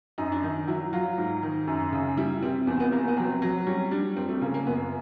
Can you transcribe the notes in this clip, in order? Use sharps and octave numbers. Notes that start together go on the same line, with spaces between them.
F#2 D#4
D4
D#3 D#4
F#3 E4
F#3 F4
G#2
D#3
F#2
C#3
G3 E4
C3 C4
E2 C4
B3
C3 A#3
B3
F#3 C4
F#3
G3 C#4
G3 D4
F2 C4
A3
C#3 A#3
A#3
F#2 B3